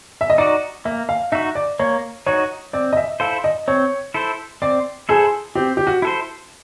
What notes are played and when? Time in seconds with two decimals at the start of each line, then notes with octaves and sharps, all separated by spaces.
0.21 E5
0.30 D#5
0.38 D#4 F#4 D5
0.85 A#3 E5
1.09 F5
1.32 D#4 F#4 E5
1.55 D5
1.79 A#3 C#5
2.26 D#4 F#4 C#5
2.73 C4 D5
2.93 D#5
2.97 E5
3.20 E4 A4 C5 F5
3.44 D#5
3.68 C4 C#5
4.14 E4 A4 C5
4.62 C4 D5
5.09 E4 G#4 A4 C5
5.55 C4 G4
5.77 G4
5.87 F#4
6.02 E4 A4 C5